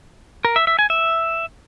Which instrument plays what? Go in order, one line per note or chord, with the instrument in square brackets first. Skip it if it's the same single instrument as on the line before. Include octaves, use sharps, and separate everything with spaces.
[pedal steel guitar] A#4
E5
E5
G#5
E5